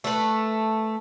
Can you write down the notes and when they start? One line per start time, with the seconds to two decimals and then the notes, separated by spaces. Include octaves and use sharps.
0.04 A3 B4